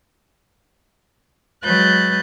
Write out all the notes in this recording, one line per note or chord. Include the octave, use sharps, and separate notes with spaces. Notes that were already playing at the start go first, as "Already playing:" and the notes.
F#3 G#3 B4 F#6 G6 A6